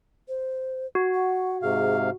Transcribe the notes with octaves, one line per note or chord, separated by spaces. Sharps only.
C5
F#4
F#5
G#2 C3 G#4 F5